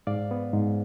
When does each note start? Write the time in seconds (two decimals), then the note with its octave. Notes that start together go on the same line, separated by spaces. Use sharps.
0.07 G#2 D5 F5
0.31 B3
0.54 G#2